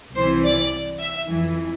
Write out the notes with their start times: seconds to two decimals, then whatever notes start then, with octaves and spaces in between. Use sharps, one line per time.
0.15 C2 C3 E3 C5
0.43 D5
0.99 E5
1.27 F2 E3